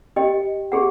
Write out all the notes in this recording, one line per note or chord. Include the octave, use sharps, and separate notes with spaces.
G4 D#5 G5
G4 G#4 F#5